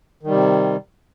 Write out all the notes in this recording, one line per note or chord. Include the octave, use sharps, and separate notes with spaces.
C3 D#3 G3